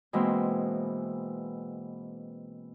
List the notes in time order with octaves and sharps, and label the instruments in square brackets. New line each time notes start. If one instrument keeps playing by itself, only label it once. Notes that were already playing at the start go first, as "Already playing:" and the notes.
[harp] B2 E3 G#3 A#3 C4